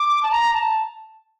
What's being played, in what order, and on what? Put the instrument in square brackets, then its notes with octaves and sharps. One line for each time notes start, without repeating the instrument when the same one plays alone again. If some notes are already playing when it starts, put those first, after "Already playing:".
Already playing: [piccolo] D6
A5
A#5
A5